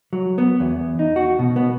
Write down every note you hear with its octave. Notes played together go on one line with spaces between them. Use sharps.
F#3
B3
E2
D#4
F#4
B2
B3